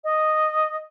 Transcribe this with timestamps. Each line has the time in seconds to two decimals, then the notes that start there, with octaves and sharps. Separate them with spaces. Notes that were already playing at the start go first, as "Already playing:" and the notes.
0.04 D#5